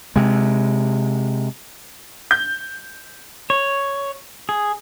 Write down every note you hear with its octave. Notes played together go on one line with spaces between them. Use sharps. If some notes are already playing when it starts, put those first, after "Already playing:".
C3 G#3
G6
C#5
G#4